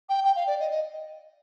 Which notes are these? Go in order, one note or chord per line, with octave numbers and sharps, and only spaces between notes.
G5
G5
F5
D5
D#5
D#5